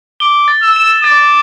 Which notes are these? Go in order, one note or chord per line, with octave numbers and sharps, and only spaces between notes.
D6 G7
A6
E6
E7
D6 A6